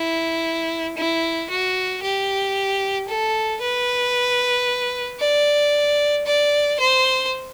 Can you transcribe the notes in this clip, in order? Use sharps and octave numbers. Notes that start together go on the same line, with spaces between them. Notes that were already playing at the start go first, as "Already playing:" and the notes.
Already playing: E4
E4
F#4
G4
A4
B4
D5
D5
C5